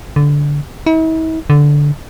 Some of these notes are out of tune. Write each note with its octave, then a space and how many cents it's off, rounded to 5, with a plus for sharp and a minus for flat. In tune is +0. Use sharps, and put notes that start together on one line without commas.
D3 -15
E4 -45
D3 -10